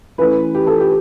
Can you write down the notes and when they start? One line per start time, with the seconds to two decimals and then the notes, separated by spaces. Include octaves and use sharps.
0.18 E3 A3 C#4 B4
0.55 G4
0.67 A4
0.80 G4